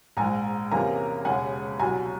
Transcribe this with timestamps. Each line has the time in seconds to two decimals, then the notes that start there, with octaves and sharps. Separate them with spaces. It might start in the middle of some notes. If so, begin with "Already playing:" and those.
0.17 A#1 G#2 F3 G#5 A#5
0.71 E2 C3 F3 A#3 C#4 G#5 A#5
1.25 E1 D#2 C#3 F#5 G#5
1.79 C2 B2 F#3 G#5 A#5